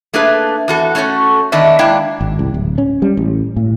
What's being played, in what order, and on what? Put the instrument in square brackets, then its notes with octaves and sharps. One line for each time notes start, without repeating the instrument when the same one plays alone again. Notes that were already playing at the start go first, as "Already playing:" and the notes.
[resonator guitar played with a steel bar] A3 A#3 D4 G#4 B4
E2 F#4 A4
A3 C#4 F#4 A4 C#5
D#3 B3 D4 D#5 E5
G#3 A#3 D4 E4 F5 G5
[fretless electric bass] G#1
C2
D1
C#4
G3
A1
A2